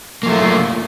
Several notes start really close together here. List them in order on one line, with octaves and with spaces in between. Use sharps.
A#3 F#3 A3 F4